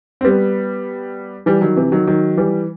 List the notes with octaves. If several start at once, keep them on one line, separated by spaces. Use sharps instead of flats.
C4
G3 B3
E3 G3
D#3 F#3
C3 E3
D#3 F#3
D#3 F#3
E3 G3